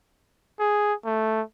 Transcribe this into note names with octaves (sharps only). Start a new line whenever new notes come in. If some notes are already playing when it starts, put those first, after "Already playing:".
G#4
A3